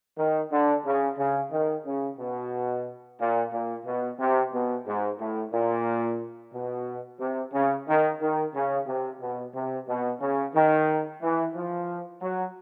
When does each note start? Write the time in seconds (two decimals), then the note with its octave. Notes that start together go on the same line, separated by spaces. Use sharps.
0.18 D#3
0.51 D3
0.85 C#3
1.17 C#3
1.51 D#3
1.85 C#3
2.19 B2
3.19 A#2
3.52 A#2
3.86 B2
4.19 C3
4.52 B2
4.86 G#2
5.19 A2
5.52 A#2
6.53 B2
7.19 C3
7.53 C#3
7.87 D#3
8.21 D#3
8.54 C#3
8.87 C3
9.20 B2
9.54 C3
9.88 B2
10.20 C#3
10.54 D#3
11.22 E3
11.54 F3
12.21 F#3